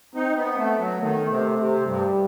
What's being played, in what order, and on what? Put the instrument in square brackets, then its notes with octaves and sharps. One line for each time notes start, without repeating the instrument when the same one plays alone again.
[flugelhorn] C4 [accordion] D#4
[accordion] B3
[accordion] A3 [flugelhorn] B3
[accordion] F#3
[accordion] D#3 [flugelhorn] A3
[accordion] C3
C3
[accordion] G2 [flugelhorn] G3